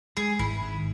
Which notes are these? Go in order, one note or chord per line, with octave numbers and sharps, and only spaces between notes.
G#3 G#4
G#1 E4
G#2